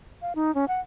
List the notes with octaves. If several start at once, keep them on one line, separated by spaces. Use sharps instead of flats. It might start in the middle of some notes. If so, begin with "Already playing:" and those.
F5
D#4
C#4
F#5